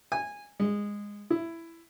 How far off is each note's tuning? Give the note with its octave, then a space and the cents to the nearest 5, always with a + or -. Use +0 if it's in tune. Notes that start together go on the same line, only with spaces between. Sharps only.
G#5 -15
G#3 -15
E4 +10